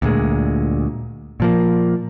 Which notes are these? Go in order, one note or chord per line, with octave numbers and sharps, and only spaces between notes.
D2 A#2 G#3
A#2 F3 A#3